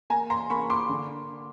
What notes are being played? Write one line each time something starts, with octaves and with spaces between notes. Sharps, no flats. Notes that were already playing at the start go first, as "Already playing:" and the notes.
A#3 G#5 A#5
A#5 C6
A#3 B5 C#6
C6 D6
D3